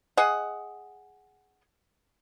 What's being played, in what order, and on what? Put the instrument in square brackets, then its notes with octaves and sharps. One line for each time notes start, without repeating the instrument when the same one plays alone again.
[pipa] G#4 D#5 F#5